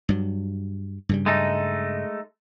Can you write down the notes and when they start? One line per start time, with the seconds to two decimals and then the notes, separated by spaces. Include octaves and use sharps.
0.09 G2 F#3
1.09 G2 C#3 G3
1.26 G#3 A3 D#4